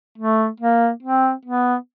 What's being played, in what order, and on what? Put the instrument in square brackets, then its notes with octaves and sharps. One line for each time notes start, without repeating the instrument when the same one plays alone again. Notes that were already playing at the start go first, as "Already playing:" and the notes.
[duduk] A3
A#3
C4
B3